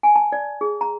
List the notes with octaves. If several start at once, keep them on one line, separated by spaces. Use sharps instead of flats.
G#5
A5
D5
G#4
A#5